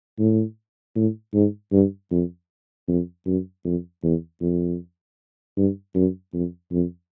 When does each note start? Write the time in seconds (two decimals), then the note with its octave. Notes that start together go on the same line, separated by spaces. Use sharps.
0.19 A2
0.96 A2
1.34 G#2
1.72 G2
2.11 F2
2.88 F2
3.26 F#2
3.65 F2
4.03 E2
4.41 F2
5.57 G2
5.95 F#2
6.33 F2
6.72 F2